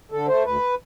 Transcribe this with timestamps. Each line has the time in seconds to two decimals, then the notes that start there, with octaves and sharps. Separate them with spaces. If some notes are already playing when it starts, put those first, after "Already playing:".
0.12 D3 A4
0.27 A3 C5
0.44 D2 B4